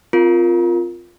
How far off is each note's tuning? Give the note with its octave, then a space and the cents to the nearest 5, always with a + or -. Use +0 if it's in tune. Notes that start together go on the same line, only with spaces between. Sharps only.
C4 +0 F4 +0 A#4 +0